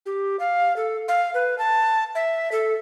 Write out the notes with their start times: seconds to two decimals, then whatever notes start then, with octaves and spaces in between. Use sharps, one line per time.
0.06 G4
0.40 F5
0.76 A4
1.08 F5
1.34 B4
1.58 A5
2.15 E5
2.52 A4